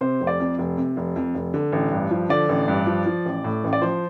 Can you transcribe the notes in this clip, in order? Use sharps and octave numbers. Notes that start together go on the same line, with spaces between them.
C3 C5
F1
D5
F2
F1
C3
F1
F2
F1
D3
A1
G2
F3
D3 D5
A1
G2
F3
F3
A1
A2
A1
D5
F3 C5